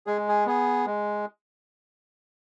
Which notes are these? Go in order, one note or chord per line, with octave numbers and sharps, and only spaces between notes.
G#3 G#4
G#4
B3 G#4
G#3